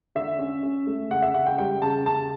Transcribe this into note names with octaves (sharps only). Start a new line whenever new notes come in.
D3 E5
C#4
C#4
A3
C#3 F#5
E5
C#3 F#5
G5
G3 G5
C#3 A5
C#3 A5